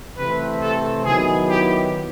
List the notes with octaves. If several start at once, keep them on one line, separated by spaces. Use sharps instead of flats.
C3 E3 A3 C4 B4
A4
D#3 F#3 B3 E4 G#4
G4